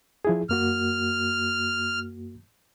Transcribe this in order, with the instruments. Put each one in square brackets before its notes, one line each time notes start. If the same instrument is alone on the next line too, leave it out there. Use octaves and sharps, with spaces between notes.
[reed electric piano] F3 E4 G#4
[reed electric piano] F#2 A#3 F#4 [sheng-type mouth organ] F6